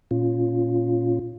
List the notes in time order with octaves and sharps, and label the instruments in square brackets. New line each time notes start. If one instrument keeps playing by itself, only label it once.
[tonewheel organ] A#2 C#4 F4